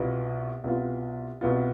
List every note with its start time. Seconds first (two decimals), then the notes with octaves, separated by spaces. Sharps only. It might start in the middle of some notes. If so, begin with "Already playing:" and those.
Already playing: C2 B2 B3 F4
0.64 C2 B2 B3 F4
1.41 C2 B2 B3 F4